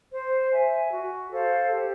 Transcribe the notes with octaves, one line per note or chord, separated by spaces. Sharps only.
C5
E5 G#5
F#4
A4 C5 F5
G4